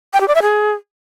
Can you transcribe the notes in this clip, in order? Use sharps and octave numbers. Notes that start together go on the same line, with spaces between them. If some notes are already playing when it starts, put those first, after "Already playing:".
G5
G4
D5
E5
G#4